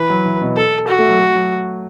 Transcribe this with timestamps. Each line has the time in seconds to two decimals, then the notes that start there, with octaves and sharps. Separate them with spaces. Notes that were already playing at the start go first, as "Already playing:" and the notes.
Already playing: E3 B4
0.10 F#3
0.26 E3
0.41 B2
0.57 A4
0.88 F#4
0.98 A3
1.09 F#3
1.19 A3
1.35 F#3